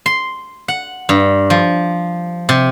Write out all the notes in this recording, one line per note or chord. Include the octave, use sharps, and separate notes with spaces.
C6
F#5
G2
F3
C3